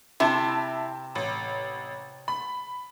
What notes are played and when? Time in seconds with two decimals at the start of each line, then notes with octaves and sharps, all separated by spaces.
0.20 C3 E4 A5
1.15 A1
2.28 B5